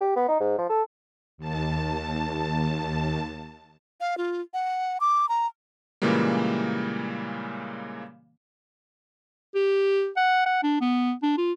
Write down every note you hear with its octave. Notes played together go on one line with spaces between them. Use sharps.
G4
B3
D#4
G#2
F3
A4
D#2 A5
F5
F4
F#5
D6
A#5
A#2 C#3 E3 G3 G#3 A#3
G4
F#5
F#5
D4
B3
D4
F4